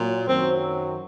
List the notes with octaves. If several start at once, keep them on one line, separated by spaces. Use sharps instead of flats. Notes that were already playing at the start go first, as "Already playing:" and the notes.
Already playing: A#2 F#3
F#2 D#3 F#3 C4